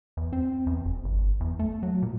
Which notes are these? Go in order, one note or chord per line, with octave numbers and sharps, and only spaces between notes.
E2
C4
E2
F1
G1
E2
A3
F#3
A#2